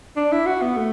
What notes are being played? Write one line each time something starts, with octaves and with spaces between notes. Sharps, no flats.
D4
E4
F#4
B3
A3